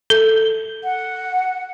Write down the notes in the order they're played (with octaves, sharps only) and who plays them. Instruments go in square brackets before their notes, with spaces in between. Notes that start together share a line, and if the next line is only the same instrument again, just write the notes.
[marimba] A4
[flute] F#5